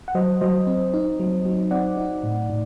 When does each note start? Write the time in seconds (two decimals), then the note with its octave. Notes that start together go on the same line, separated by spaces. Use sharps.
0.08 F#5
0.15 F#3 C5 D#5
0.41 F#3 C5 D#5
0.67 C4
0.94 D#4
1.20 F#3
1.45 F#3
1.71 C4 D5 F#5
1.97 D#4
2.23 A2
2.50 A2